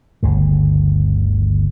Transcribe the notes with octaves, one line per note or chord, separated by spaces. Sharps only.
G1 D2 C#3